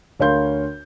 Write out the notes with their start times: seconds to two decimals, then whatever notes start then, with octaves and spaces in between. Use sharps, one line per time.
0.19 D2 A#4 C#5 F5 C6 G6